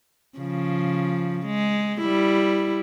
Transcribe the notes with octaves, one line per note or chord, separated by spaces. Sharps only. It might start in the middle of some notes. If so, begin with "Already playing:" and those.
C#3 F3
G#3
G3 E4